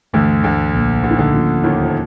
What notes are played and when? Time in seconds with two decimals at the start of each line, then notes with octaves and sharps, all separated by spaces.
0.13 D2 G2 D3 E3 A3
0.43 D2 D3
0.74 B1 A#2 F3 A#3
1.04 D3
1.11 D#3
1.18 D2 D3
1.34 A2 F3 A#3 C#4 F4
1.63 D#2 D#3
1.82 F3